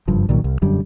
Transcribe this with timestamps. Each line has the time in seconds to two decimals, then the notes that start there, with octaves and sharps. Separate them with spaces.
0.08 F#1 G2 F3
0.29 C2 A#2 D#3 F#3
0.44 C2
0.62 E1 F#2 D3 G3